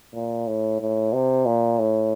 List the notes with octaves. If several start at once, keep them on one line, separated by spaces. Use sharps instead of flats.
A#2
A2
A2
C3
A#2
A2